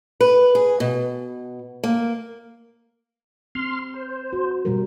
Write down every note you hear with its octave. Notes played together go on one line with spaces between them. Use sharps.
B4
G#4
B2
A#3
C4 C6 F6
C5
F#4
B2 G3 A#4